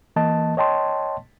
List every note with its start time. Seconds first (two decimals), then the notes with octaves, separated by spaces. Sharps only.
0.16 E3 A#3 D#5 A5
0.57 C#5 D#5 G5 A5 C6